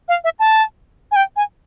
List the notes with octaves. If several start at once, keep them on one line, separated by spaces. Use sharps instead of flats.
F5
E5
A5
G#5
G5
G#5